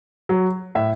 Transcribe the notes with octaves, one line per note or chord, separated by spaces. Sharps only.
F#3
A2 E5